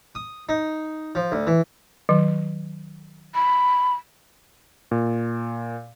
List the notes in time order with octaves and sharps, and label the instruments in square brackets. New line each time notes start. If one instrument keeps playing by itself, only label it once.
[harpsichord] D#6
D#4
F3
D2
E3
[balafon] D#3 F#3
[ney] B5
[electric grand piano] A#2